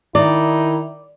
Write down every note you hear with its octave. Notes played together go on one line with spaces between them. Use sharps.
D#3 D#4 E4 D5